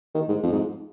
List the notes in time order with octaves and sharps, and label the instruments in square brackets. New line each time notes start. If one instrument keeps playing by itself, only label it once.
[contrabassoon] D#3
G#2
F2
G#2